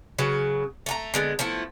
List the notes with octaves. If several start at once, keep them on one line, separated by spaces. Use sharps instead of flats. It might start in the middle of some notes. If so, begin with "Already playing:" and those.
C#3 F#3 B4
A3 F#5 A#5
D3 G#3 B3
F3 A3 B3 E4